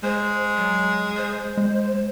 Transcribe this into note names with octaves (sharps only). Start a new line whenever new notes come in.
G#3 C5
F#3
C5
G#3